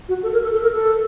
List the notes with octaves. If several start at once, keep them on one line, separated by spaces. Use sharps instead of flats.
F#4
A4
A#4
A4
A4
A#4
A4